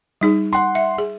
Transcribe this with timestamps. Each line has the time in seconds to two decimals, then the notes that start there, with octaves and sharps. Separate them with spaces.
0.21 G3 D#4 G#4
0.53 F#5 C6
0.75 E5
0.98 G#4